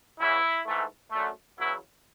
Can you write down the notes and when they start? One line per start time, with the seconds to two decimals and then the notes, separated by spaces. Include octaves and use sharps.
0.19 E2 C#3 E3 E4
0.65 G#2 E3 A3
1.11 F#2 D3 A3
1.57 E2 C#3 F#3 B3 E4